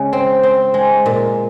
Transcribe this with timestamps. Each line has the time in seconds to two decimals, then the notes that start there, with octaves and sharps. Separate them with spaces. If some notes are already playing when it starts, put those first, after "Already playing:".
Already playing: C#3 G#3
0.13 C4
0.43 C4
0.74 G#3
1.06 A#2